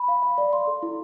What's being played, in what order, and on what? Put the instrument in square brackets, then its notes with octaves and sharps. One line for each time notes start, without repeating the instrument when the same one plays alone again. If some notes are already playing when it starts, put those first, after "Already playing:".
Already playing: [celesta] B5
F5
F5
D5
C6
A4
E4